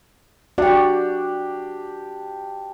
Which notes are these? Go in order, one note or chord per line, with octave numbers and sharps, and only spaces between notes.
D4 F#4 G4 D5 F#5